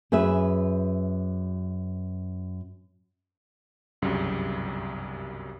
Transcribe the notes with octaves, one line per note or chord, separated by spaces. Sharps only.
F#2 G#4 B4 E5
G1 C2 F#2 C#3 F#3 G3